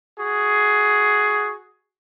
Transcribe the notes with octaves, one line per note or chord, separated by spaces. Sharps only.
F#4 G#4